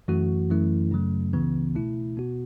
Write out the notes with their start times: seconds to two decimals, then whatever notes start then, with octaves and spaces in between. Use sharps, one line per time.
0.08 F#2 E3 A3 F#4
0.50 F#2 E3 A3 E4
0.91 F#2 C#3 F#3 A3
1.33 C#2 C#3 E3 B3
1.75 B2 A3 E4
2.17 B2 B3 F#4